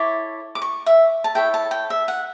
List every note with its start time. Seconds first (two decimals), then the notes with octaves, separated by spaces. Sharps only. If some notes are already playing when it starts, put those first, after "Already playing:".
Already playing: E4 A4 C#5 D6
0.55 D6
0.62 C#6
0.86 E5
1.24 A5
1.35 E4 A4 C#5 G5
1.54 A5
1.71 G5
1.90 E5
2.08 F#5